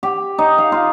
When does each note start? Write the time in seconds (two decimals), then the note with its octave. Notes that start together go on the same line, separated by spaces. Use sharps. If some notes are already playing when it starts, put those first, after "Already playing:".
0.03 G4
0.38 D#4
0.58 F5
0.72 F4